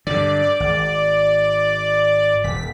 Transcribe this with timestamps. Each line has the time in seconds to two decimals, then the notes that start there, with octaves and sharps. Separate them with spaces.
0.07 G2 D3 D5
0.60 G#1
2.44 D#1 B6